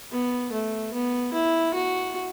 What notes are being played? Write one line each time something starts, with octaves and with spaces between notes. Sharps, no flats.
B3
A3
B3
E4
F#4